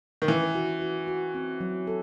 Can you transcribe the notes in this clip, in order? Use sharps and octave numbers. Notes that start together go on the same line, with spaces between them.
D#3
E3 C#4
F#4
F#4
F#4
C4
F#3
A4